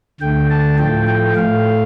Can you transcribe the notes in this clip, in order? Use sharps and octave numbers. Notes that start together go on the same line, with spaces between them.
D2 D3 A3 G5
A5
A2 F3 A3 G5
G5
A2 A3 F5